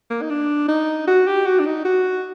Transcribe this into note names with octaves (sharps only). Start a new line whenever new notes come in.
A#3
D#4
D4
D#4
F#4
G4
F#4
D4
D#4
F#4